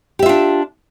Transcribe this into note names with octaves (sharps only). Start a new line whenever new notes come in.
D4 F4 G4 E5